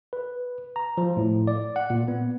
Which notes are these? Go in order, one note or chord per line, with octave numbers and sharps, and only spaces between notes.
B4
A#5
F3
A2
D5
F#5
A#2
B3